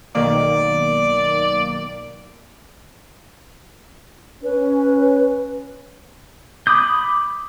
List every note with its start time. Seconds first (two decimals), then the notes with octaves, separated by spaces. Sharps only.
0.15 B1 D#3 A#3 D5
4.43 C#4 B4
6.67 B5 D6 D#6 G6